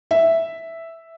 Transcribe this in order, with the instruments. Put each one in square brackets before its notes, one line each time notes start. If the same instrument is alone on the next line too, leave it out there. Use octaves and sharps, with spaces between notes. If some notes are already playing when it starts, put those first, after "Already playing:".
[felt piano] E5